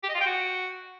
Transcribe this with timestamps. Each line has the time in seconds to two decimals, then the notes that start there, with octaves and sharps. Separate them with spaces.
0.03 G4
0.09 D#5
0.15 F4
0.20 G5
0.26 F#4